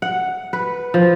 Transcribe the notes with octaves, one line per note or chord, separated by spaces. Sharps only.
F#5
B4
F3